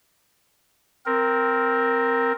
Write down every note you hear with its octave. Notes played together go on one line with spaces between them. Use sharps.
C4 A#4